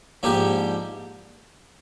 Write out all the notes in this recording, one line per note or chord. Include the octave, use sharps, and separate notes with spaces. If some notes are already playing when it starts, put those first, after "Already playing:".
G#2 F3 A#3 D4 G4